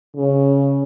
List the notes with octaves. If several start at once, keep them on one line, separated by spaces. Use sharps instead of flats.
C#3